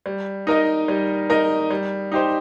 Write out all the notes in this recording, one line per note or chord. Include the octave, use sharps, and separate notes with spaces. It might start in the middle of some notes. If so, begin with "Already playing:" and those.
G3
D#4 A#4 D#5
G3
D#4 A#4 D#5
G3
D#4 G4 C5